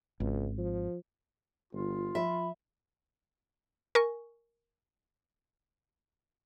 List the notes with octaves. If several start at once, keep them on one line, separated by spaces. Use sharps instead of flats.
G#1 C#2
F3
G1 F4
F3 E5 B5
A#4 G#5 C#6